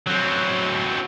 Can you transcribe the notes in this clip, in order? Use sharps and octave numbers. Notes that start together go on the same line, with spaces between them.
F#3 C4